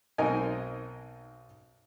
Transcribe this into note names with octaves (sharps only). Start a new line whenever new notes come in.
B1 C4 D#4 A#4 D#5 G#5